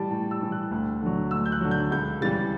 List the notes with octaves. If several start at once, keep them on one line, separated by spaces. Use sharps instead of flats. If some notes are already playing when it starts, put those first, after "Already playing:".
Already playing: A2 E3 G3 G5 A5
A2 A5
E6
E3 G3
F#6
D2
D3 F#3
D2 E6
G6
F#6
D3 F#3
G6
C#2 G6
C#3 E3 G3 A6